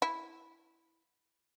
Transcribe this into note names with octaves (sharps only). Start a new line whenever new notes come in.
E4